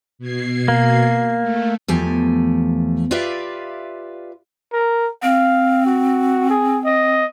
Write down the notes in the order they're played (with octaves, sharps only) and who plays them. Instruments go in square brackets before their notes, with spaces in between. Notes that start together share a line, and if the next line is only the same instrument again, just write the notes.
[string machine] B2 G#6 C7
[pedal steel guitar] A#3
[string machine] A3
[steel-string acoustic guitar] E2 F3 A3 G4 G#5
F4 G4 B4 D5 E5 F5
[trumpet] A#4
[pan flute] C4 [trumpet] F5
[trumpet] F#4
G#4
D#5